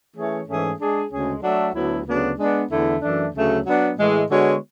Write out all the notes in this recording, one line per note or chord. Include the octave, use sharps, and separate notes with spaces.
E3 A3 C#4 G#4 C#5
G#2 E3 A3 C#4 G#4
G#3 D4 G#4
D2 C#3 G#3 C#4 G#4
F#3 A3 D4 A4 E5
D2 D3 F#3 B3 E4
D2 C#3 F#3 B3 D4
G#3 B3 D4
E2 D3 A3 E4
F#2 E3 A3 D4
D2 C#3 F#3 A3
F#3 B3 D4
A2 E3 G#3
D3 G#3 B3 F#4 C#5